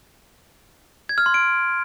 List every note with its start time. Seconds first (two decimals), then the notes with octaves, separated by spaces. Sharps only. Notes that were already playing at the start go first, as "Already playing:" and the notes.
1.09 G#6
1.18 F6
1.26 C6
1.34 D7